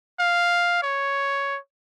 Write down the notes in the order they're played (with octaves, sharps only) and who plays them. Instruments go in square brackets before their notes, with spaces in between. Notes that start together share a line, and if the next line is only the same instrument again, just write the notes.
[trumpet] F5
C#5